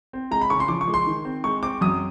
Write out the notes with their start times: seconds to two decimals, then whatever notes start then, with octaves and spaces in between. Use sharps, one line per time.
0.13 C4
0.31 G#3 A#5
0.41 B5
0.50 C#3 C#6
0.60 C6
0.68 F3 D6
0.81 C#6
0.88 G#3
0.94 C6
1.07 D#3
1.25 C4
1.44 G#3 C#6
1.63 C4 D6
1.81 F#2 D#6